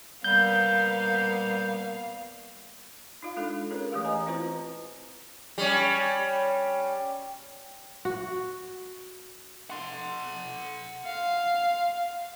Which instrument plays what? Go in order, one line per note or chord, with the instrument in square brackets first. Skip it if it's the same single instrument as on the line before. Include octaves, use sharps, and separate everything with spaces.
[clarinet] G3 [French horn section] A#3 B3 [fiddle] F5 [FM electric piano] G6
[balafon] D#4 F4 F5
G#3 D4 F4 A4
C#4 G#4 A#4 B4 C#5
E3 A3 G4 F5
B4 D#5 G#5 A#5
C4 E4 F4 B4 C5 A#5
[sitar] G3 C#4
[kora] F#4
[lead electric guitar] F#5 C6
[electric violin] F5